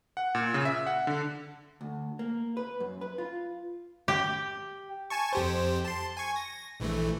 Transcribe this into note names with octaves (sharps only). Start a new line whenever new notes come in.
F#5
A#2
C#3
E5
F#5
D3
D2
A#3
B4
F#2
B4
F4
G4
G#5 A5 C#6
F2 G4 C5
A5 C6
G#5 C#6
A#6
A#1 E3 A3